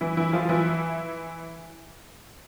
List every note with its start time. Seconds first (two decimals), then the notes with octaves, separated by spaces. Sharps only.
0.01 E3 E4
0.17 E3 E4
0.33 F3 F4
0.49 E3 E4